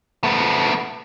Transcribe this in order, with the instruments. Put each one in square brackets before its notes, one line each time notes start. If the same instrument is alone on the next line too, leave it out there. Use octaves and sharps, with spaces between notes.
[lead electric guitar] A3 B3